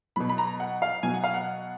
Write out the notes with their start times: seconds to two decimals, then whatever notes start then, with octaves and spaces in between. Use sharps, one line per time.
0.16 B2 F#3 B5
0.30 B5
0.38 A#5
0.60 F#5
0.82 F5
1.03 B2 F#3 G#5
1.14 F#5
1.24 F5
1.34 F#5